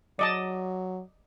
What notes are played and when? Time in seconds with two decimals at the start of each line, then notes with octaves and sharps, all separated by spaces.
0.19 F#3 D5 D#5 A5